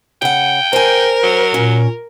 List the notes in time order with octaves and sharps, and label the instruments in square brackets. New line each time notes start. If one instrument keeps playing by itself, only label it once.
[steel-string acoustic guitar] C#3 F#5 [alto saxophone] G5
[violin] A#4 [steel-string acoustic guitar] C5 G#5
[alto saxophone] F#3
[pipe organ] A#2 [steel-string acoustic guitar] C#4